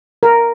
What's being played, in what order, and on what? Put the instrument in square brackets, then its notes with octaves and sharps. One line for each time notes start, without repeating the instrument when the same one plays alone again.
[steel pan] A#4